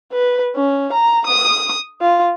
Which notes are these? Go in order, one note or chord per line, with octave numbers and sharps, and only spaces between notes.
B4
C#4
A#5
D#6
F4